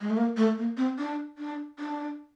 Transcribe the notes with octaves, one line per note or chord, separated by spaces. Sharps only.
G#3
A3
A#3
A3
A#3
C4
D4
D4
D4